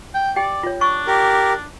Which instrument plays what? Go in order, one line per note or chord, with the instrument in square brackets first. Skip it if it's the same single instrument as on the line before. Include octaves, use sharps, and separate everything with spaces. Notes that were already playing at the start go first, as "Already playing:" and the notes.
[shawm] G5
[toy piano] G4 G5 [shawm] D5
[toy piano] F4 C#5
[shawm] D4 [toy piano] C#6
[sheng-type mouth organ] G4 A#4